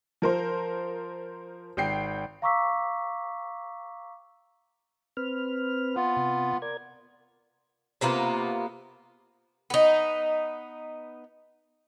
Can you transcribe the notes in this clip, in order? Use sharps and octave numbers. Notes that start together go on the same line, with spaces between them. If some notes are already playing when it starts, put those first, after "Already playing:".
F3 A#4 C5
G#1 G5 C7
F5 A#5 C#6 D6 E6 B6
C4 B4 F6
B3 F4
C3
A#4 D5 G#6
C3 A#3 B3 F4
B3 D#4